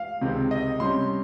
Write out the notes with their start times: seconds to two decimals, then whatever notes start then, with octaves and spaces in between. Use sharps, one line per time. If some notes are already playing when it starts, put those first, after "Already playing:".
Already playing: F5
0.21 C#2 C3 D#3 G#3 C4
0.51 D#5
0.80 C3 G3 C#4 C6